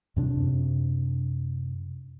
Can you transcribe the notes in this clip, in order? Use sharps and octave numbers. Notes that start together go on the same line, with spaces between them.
F#2 C3 D4